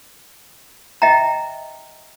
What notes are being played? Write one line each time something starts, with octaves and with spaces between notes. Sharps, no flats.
D#5 E5 G5 A#5